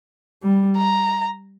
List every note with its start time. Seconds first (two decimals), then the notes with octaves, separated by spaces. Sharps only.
0.43 G3
0.77 A#5